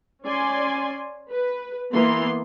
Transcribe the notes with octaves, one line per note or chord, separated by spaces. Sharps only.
C#4 D5 G#5 C6
B4
E3 A#3 B3 C6